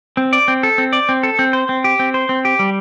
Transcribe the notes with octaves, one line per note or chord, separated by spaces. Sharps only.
C4
D5
C4
A4
C4
D5
C4
A4
C4
C5
C4
G4
C4
C5
C4
G4
G3